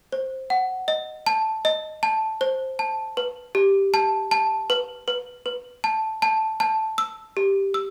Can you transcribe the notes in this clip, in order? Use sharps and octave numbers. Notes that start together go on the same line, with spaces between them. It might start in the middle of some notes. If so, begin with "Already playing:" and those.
C5
F#5
D#5
A5
D#5
A5
C5
A5
B4
G4
A5
A5
B4
B4
B4
A5
A5
A5
E6
G4
E6